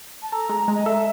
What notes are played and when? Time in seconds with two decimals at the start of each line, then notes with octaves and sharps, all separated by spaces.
0.22 A5
0.32 A4 A#5
0.49 G#3
0.68 G#3
0.75 D#5
0.86 A4 E5